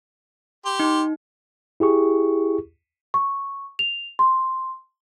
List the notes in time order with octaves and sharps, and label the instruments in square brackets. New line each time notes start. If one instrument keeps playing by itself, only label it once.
[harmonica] G4 C6
[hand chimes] D#4
[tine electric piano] E4 G4 G#4 C#6
[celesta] C#6
F7
C6